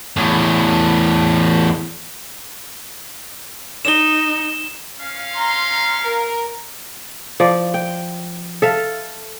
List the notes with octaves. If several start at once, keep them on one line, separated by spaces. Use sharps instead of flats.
E2 A2
D#4 E7 G7
C#4 F5
A#5 C6
A#4
F3 D5
G5
A4 E5 F5